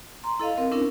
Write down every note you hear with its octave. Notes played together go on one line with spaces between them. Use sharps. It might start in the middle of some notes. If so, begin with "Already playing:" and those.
A#5 C6
E4 A4 D#5 F5
C4 A#4
C#4 D4 E4 A#4